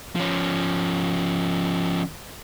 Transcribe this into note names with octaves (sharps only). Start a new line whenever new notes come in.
F3 C#4